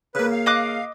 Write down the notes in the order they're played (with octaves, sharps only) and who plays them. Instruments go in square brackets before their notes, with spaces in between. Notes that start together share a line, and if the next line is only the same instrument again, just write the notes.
[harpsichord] C#3 A#3 [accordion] B4
[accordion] F5
[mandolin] D#5 D6 F#6